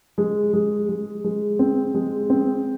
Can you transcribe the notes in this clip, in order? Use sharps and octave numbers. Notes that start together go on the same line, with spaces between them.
G#3
G#3
G#3
G#3
C4
G#3
C4